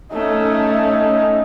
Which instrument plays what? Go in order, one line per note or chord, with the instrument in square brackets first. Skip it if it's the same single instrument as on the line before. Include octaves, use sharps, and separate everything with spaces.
[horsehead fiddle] A3 C#4 [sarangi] D#4